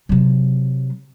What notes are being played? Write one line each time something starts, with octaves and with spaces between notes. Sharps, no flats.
C3 F#3